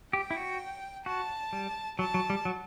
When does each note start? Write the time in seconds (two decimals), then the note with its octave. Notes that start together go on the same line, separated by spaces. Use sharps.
0.13 G4 G5
0.31 E4
0.37 F#4
1.06 F#4 A5
1.53 G3
1.99 F#3 A5
2.14 F#3
2.30 G3
2.45 F#3